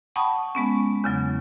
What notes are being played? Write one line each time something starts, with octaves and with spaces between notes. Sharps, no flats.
F#5 G5 A5 B5 C#6 D#6
G#3 B3 C#4
E2 C#3 F#3